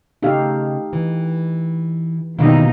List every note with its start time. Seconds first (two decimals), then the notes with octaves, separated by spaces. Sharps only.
0.23 C#3 A3 D#4 G4 F5
0.93 E3
2.39 B2 D#3 F#3 A#3 D#4 E4 G4